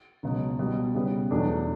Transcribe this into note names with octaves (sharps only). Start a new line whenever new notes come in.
C#2 B2 F#3
B2 G3 B3
C#3 G3 B3
E2 B2 F#3 A3 D4